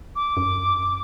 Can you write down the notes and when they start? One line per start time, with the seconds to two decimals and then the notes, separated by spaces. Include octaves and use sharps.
0.16 D6
0.37 F#2